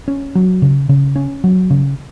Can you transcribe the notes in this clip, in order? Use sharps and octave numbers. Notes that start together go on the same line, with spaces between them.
C#4
F#3
C#3
C#3
C#4
F#3
C#3